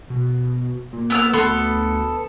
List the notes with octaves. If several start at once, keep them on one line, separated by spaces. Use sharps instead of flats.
B2
A#2
A#2 B3 E6 F6
D2 B3 A4 C6